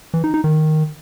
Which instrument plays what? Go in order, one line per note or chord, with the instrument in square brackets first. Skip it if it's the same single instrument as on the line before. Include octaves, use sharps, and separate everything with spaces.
[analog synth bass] E3
D#4
D#4
D#3